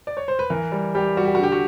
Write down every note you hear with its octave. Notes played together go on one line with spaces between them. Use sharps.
D5
C#5
C5
B4
E3 A#4
G3
G3 G4
G3 F#4
G4
F#4
D3 G4
F#4